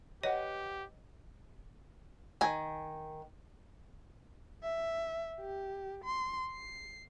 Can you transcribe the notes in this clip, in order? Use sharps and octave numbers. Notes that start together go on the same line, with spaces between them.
G4 B4 C#5 D#5 F#5
D#3 G#5
E5
G4
C6
C7